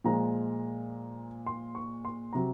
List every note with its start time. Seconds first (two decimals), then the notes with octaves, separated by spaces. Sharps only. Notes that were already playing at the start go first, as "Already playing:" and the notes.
0.04 A#2 F3 G#3 A#5
1.46 C6
1.75 C#6
2.05 C6
2.33 C3 F#3 A#5